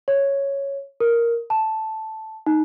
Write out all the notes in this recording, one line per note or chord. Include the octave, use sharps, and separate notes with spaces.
C#5
A#4
A5
D#4